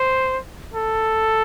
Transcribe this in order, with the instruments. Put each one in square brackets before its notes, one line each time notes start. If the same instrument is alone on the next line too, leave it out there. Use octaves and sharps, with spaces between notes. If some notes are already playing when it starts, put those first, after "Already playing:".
Already playing: [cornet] C5
A4